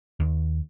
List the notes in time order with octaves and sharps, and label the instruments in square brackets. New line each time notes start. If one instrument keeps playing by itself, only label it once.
[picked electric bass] D#2